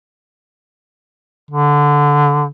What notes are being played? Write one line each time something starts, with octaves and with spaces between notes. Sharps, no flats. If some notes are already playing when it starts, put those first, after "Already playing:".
D3